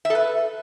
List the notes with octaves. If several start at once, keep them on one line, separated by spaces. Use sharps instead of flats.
E5
A4
B4